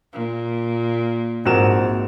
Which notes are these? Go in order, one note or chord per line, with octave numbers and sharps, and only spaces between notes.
A#2
A#1 G#2 C4 F#4 A#4 E7